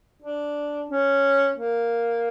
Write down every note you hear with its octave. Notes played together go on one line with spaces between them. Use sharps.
D4
C#4
A#3